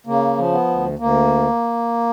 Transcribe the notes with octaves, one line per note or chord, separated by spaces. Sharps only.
C#3 A#3
F3
B3
D2
D2 A#3